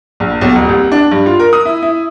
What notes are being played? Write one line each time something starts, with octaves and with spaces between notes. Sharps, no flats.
A#1
B1
D#1
C2
D4
G2
F4
A#4
D#6
E4
E4